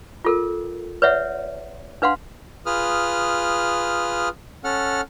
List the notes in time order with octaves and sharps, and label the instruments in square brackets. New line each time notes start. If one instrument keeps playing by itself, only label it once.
[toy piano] F4 A4 A#4
B4 C#5 D5 E5 F#5
D4 B4 F5 F#5 C6
[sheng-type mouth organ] F4 G#4 B4 D#6 F6
C#4 A4 F#5 F6